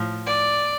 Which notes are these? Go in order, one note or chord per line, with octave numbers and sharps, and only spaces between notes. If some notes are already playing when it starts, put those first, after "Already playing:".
Already playing: A2 F3
D5